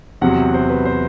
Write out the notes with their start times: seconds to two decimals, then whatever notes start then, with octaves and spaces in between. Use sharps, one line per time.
0.21 E2 C3 F#3 C4 F#5
0.54 C5
0.70 B4
0.85 C5